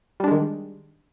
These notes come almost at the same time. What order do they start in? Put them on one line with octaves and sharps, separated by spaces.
G3 D4 G#3 D#3